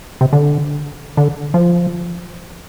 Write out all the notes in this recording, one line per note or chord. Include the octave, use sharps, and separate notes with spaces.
C3
D3
D3
F3